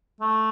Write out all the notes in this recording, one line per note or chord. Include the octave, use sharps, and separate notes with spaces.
A3